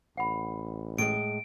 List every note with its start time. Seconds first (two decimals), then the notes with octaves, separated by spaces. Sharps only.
0.17 A1 F#5 B5
0.98 A2 G#3 D7